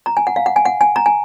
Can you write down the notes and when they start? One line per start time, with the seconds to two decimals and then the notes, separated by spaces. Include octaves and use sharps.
0.06 A#5
0.17 G#5
0.27 F#5
0.36 F5
0.46 F#5
0.56 G#5
0.65 F#5
0.81 G#5
0.96 A#5
1.06 G#5